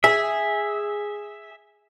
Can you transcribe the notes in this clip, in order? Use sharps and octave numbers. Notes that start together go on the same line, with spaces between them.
G#4 E5